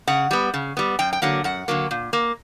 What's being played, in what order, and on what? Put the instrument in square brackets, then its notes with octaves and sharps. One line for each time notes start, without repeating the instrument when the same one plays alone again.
[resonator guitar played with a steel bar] C#3 F#5
G3 B3
C#3
G3 B3
F#2 G5
G5
D3 F#3 A#3 F#5
F#2 F#5
D3 F#3 A#3
A#2
A#3